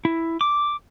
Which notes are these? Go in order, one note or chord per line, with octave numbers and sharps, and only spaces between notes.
E4
D6